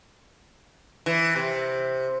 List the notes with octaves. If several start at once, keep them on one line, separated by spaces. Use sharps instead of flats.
E3
C3